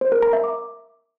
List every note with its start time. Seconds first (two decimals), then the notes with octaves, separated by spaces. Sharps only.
0.01 C5
0.12 A#4
0.22 A#5
0.33 E5
0.44 D6